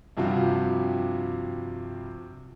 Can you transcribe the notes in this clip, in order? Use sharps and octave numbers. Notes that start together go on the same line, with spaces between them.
G2 C3 F3 G3 F4 F#4